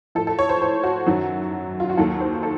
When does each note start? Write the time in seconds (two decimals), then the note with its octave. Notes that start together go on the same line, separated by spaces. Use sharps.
0.15 A2 F3 A4
0.27 A4
0.39 C#5
0.49 C5
0.62 C5
0.84 F#4
1.07 F#2 D#3 F#3
1.80 F4
1.90 F#4
1.97 D#2 D#3 F#3 A4
2.21 C5
2.43 A4